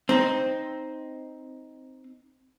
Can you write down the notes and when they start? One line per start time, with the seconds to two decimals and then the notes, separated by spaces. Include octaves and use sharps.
0.09 C4 D#4 C5